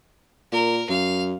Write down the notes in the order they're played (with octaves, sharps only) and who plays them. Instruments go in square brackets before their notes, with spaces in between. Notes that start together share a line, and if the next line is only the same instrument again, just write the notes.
[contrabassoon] A#2 [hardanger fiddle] A#4
[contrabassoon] F#2 [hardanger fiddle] F5